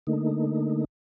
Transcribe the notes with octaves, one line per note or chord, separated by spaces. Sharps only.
D3 A3 A#3 D#4